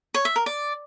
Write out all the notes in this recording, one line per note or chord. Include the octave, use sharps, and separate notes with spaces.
C#5
E5
A#4
D5